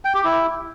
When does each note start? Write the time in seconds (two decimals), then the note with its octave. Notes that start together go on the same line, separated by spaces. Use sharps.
0.05 G5
0.14 G4
0.24 E4